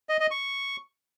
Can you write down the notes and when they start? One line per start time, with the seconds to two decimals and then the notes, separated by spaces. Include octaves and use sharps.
0.09 D#5
0.20 D#5
0.31 C#6